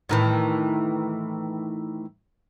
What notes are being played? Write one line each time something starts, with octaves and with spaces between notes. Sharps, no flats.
A2 D#3 E3